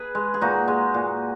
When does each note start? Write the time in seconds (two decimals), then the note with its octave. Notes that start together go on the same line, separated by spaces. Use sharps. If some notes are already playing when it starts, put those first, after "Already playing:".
Already playing: G#4 B4
0.15 G#3
0.34 G#4
0.41 A#2 D#4 F#4
0.68 G#3
0.94 A#2